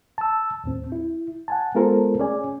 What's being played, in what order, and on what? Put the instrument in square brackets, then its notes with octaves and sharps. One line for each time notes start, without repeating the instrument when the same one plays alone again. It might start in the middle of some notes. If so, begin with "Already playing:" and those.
[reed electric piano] A5 E6
D#2 A2 C4
E4
F#5 G#5 A5
G#3 B3 F4 A4 A#4 C5
A3 C#4 G#4 D5 G#5